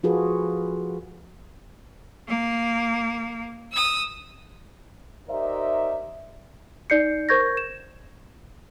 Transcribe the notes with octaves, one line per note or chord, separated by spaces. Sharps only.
F3 F4 F#4 G#4 A4 B4
A#3
D#6 E6
D#4 G4 A#4 C5 D5 E5
D#4 D5 G6 C7 C#7
A#4 C5 C#6 G6 G#6 A#6
E7